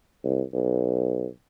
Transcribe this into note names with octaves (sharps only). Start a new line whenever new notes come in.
C2
B1